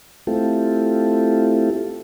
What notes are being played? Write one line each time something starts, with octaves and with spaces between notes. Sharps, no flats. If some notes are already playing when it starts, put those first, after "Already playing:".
A3 C4 E4 F4 G4 A4